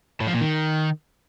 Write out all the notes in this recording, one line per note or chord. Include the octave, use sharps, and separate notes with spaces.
A2
F3
A#2
D#3